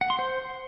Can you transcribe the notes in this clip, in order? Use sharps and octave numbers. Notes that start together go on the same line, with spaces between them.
F#5
C6
C5